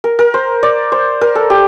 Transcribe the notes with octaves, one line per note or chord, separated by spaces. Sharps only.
A#4
A#4
C5
D5
C5
A#4
A4
G4